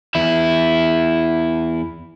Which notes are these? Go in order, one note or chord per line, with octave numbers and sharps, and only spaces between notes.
E2 E4